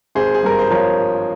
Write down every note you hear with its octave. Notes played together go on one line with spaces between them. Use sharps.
G#1 G#4 C5
G#4
G2 A#4
C5
F3 A#4 C#5